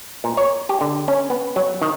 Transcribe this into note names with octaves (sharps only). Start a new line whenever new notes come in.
A#2
C#5
G4
D3
C#4
B3
F#3
D#3